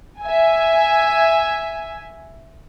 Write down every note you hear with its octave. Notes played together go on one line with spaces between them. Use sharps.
E5 G#5